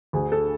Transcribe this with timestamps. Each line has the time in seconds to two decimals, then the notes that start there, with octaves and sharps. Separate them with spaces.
0.13 D2 D3 G#4
0.32 A4